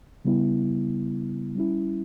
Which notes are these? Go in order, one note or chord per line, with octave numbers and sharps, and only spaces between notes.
C#3 G3 B3 E4
G3 C#4 E4